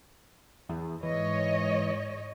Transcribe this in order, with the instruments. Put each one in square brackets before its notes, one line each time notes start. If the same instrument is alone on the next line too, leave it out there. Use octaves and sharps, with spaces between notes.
[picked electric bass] E2
[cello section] G#2 C#5 D#5 [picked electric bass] E3